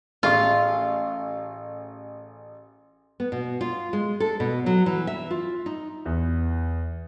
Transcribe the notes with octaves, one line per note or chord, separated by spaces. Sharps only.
A1 F4 G#4 C#6
B3
B2
F4
G#3
A4
B2
F#3
E3
E5
F4
D#4
E2